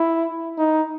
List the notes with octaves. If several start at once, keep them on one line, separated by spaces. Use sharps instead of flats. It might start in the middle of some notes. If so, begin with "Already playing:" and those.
Already playing: E4
D#4